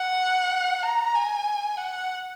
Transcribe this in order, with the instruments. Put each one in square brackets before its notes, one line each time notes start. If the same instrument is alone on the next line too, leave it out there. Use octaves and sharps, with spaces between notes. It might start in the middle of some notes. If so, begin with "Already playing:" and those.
Already playing: [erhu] F#5
A#5
G#5
F#5